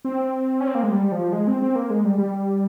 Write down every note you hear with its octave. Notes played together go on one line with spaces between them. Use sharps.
C4
C#4
C4
A#3
G#3
G3
F3
G#3
C4
C4
A#3
G#3
G3
G3